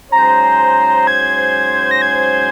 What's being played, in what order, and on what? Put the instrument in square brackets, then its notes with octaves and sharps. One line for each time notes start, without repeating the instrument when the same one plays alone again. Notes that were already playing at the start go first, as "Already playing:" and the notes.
[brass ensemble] G#2 F#3 C#4 G#4 C5 [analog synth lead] A#5
[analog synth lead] G#6
A#6
G#6